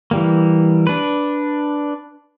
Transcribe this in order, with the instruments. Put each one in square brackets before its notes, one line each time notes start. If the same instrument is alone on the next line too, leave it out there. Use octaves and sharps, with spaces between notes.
[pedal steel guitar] E3 G3 A#3
D4 B4